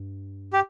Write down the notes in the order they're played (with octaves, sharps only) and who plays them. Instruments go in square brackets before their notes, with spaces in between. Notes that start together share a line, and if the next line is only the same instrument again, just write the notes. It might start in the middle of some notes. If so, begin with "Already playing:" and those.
Already playing: [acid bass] G2
[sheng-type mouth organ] G4